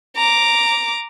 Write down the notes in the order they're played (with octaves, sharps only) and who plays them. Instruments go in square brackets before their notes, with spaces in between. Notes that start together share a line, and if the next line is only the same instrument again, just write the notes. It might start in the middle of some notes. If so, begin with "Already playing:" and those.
[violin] A#5 D6